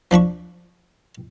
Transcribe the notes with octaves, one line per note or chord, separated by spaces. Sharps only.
F3 D4 B5 C#6